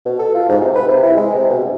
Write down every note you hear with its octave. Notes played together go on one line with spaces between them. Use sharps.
B2
A4
F4
G#2
C3
B4
C3
E4
G#3
C3
B2
G2